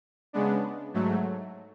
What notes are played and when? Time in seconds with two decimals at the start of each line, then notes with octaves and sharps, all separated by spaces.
0.33 C#3 G#3 B3 D4
0.94 G#2 F#3 A3